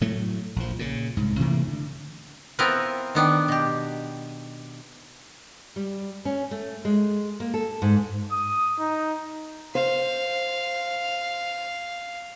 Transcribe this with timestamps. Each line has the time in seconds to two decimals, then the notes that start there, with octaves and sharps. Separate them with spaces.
0.01 A2 F#3 A3
0.56 A#1 F3
0.79 A#2 C#3
1.17 C2 G#2
1.39 C3 E3 A3 A#3
1.68 D3
2.59 B3 C4 E4 F4 A#4 B4
3.15 D#3 B3 D4
3.48 B2 G4
5.76 G3
6.25 C#4
6.51 A3
6.85 G#3
7.40 A#3
7.54 A4
7.82 G#2
8.32 D#6
8.79 D#4
9.75 C5 F5